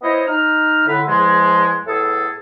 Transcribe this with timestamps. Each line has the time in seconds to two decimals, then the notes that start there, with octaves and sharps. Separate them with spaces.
0.02 B3 E4 C5 C#5 D#5
0.26 D#4 F6
0.87 A2 D3 B4
1.07 E2 F3 G#3
1.86 A2 B3 G#4 A4